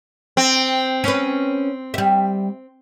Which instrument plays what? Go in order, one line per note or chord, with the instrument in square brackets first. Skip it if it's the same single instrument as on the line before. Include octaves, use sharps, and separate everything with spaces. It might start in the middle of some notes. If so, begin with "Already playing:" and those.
[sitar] C4
[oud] C#4 B4
G3 E5